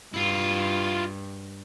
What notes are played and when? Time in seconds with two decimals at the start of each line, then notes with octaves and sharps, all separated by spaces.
0.14 G2 E4 F4